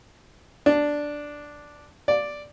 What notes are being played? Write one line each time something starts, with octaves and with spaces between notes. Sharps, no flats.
D4
D5